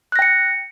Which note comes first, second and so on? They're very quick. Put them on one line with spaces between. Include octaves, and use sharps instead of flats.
F#6 A#6 G5 C#7